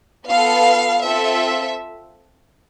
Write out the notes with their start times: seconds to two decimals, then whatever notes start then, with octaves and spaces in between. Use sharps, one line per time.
0.28 B3 F4 A4 F5
1.02 C4 F4 A4 E5